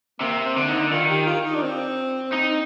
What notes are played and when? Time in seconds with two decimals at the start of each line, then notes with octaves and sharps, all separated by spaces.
0.21 C3 A#3
0.45 C4
0.56 D3
0.69 D#4
0.91 D#3 F4
1.10 G4
1.26 F4
1.45 D#4
1.55 D4
1.63 C4
2.33 D#4